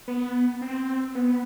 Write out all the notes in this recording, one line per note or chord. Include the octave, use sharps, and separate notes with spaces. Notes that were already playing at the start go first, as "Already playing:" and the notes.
B3
C4
B3